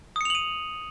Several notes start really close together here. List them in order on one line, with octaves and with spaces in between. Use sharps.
D#6 C#7 F7 F#7 D#7